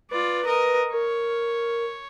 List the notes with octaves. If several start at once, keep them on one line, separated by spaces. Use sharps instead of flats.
F4 B4 D5
A#4 D#5
A#4 C#5